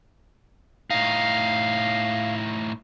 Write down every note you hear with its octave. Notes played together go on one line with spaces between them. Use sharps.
A2 D#4 F5